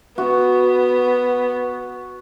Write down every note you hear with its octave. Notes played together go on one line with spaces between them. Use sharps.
B3 F#4